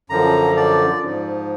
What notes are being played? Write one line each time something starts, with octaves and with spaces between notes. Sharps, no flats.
F#2 D3 F3 A#5
D5
G#2 F3